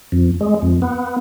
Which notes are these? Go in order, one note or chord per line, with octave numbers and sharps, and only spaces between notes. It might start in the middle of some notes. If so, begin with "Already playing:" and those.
F2
G#3
F2
B3